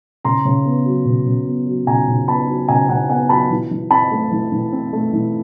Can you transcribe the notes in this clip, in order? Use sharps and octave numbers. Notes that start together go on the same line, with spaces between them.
C#3 A#5 C6
C#3
B3
F#3
C#3
C#3
B3
F#3
C#3 G#5 A#5
C#3
B3 A5 B5
F#3
C#3 G#5 A#5
C#3 F#5 G#5
B3 F#5 G#5
F#3 A5 B5
E3
E3
C4 A5 B5
A3
E3
E3
C4
A3
E3